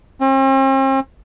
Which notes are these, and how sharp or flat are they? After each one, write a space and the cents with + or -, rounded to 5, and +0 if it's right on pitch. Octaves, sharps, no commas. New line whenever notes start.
C4 +45